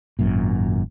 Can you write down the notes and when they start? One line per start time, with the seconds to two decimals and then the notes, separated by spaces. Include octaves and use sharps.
0.19 G#1 F#2 A#2